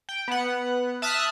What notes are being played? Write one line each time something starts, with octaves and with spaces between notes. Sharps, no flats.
G5
B3 F#5
E5 A5 D#6 F6 F#6